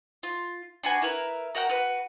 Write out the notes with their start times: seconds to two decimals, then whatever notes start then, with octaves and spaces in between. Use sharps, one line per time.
0.23 F4
0.84 D4 F#4 B4 G#5
1.02 E4 A#4 B4
1.55 F#4 A#4 F#5 G5
1.69 F#4 B4